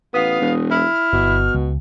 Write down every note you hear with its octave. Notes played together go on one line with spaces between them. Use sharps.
A1 B3 F5 D#6
E1
E4 F6
G1 B2
C#2